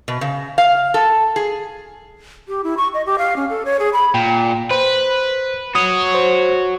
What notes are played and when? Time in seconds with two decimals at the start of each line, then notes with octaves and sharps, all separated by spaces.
0.08 B2
0.21 C#3
0.58 F5
0.94 A4
1.36 G#4
2.48 G4
2.64 E4
2.77 C#6
2.94 D#5
3.06 G4
3.18 F5
3.36 C#4
3.50 A4
3.65 C#5
3.79 G#4
3.93 B5
4.14 A#2 G5
4.71 B4 C5
5.75 F#4 C#5 D#6
6.15 C5